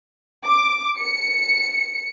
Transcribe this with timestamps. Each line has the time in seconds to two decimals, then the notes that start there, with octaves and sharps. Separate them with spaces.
0.46 D6
0.97 C#7